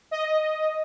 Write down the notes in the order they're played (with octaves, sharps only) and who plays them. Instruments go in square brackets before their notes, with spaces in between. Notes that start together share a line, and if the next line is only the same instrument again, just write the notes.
[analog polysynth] D#5